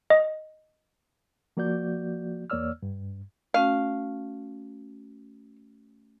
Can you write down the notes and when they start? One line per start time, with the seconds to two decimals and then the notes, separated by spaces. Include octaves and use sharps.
0.10 D#5
1.57 F3 A#3 F#4 D5 G6
2.50 E2 A#3 C#5 D5 E6 F6
2.83 G2
3.54 A3 C#4 F#4 F5